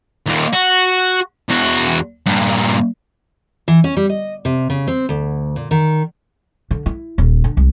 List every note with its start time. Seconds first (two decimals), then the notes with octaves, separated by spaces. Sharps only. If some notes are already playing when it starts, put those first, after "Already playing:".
0.26 D#2 A#2
0.53 F#4
1.49 E2 F#4
2.26 G2 A#2
3.68 E3
3.84 C#4
3.97 G3
4.09 D#5
4.45 C3
4.70 C#3
4.88 C4
5.09 D2
5.56 A#2
5.71 D#3
6.71 D3
6.86 E4
7.18 D#1
7.44 D3
7.57 C2